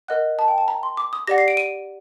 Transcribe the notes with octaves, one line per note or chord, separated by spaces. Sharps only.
A#4 D#5 F#5 F#6
A5
G5
A5
A#5
C6
D6
D#6
G4 D5 F#5 A#6
C7
D7
D#7